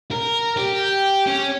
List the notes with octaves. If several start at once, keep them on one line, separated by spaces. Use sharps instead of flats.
A#4
G4
C#4